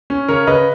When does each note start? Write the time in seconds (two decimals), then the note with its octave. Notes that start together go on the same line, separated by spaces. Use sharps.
0.10 C#4
0.28 C#3 A#4 C#5
0.47 C#3 B4 D#5